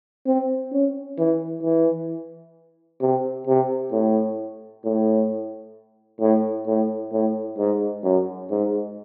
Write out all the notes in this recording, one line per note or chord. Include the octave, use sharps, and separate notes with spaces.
C4
C#4
E3
E3
C3
C3
A2
A2
A2
A2
A2
G#2
F#2
G#2